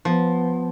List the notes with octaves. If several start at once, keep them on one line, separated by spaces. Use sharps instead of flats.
F3 B3